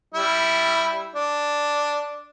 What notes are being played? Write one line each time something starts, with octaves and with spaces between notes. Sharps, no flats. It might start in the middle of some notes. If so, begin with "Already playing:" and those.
G3 E4
D4